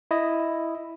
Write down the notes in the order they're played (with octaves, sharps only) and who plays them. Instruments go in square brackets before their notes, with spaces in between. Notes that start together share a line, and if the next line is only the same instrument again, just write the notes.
[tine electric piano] E4 D#5